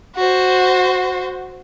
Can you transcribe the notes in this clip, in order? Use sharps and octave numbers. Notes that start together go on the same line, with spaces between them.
F#4 C5